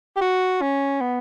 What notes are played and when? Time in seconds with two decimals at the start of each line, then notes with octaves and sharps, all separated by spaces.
0.17 G4
0.21 F#4
0.62 C#4
1.01 B3